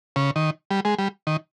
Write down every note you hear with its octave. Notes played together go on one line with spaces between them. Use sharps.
C#3
D#3
G3
G#3
G3
D#3